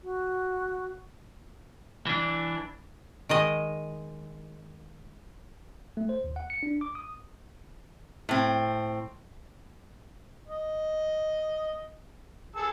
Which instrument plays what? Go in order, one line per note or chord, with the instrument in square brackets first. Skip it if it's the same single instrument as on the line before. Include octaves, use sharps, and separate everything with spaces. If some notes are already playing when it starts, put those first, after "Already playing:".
[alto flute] F#4
[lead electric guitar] E3 D4
[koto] D#3 G#3 D#5
[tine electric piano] A3
C5
D#2
F#5
C#7
D4
D6
D#6
[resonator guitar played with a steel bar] A2 C4
[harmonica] D#5
G#4 A5 E6